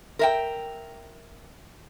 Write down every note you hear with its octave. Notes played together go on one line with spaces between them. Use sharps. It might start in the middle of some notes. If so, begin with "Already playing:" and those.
A#4 E5 G5